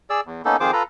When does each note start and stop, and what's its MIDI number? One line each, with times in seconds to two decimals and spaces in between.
0.10 0.21 68
0.10 0.21 74
0.10 0.21 88
0.26 0.42 40
0.45 0.56 58
0.45 0.56 59
0.45 0.56 61
0.45 0.56 63
0.45 0.56 69
0.60 0.71 41
0.60 0.71 51
0.60 0.71 65
0.60 0.71 68
0.60 0.71 72
0.60 0.71 86
0.73 0.83 65
0.73 0.83 69
0.73 0.83 71
0.73 0.83 82